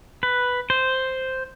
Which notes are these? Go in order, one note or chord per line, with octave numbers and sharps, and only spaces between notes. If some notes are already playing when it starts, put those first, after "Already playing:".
B4
C5